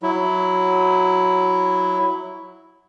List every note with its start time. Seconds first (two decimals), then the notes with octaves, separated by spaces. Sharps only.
0.02 F#3 E4